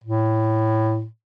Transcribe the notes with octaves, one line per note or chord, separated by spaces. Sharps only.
A2